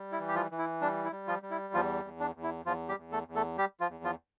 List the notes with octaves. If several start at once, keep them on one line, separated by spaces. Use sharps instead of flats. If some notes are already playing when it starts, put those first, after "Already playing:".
Already playing: G3
E4
E3
G4
F3 F4
E3
E4
G3 D4
E4
G3
F3 F4
G3
E4
E2 F3 F4
E2
D4
E2
E4
E2 F3 F4
G3 G4
E2
A3 A4
E2
A3 A4
G3 G4
F3 F4
E2
F3 F4